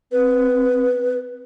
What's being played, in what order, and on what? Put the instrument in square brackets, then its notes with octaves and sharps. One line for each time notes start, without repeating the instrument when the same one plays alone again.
[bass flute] C4 [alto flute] B4